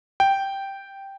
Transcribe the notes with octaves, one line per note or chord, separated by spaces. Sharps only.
G5